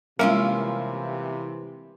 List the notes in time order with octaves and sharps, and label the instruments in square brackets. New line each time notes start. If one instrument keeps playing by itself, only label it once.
[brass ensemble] C3 E3 [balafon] G3 G#3 [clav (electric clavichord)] A#3 [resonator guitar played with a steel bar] C#4 E4 F4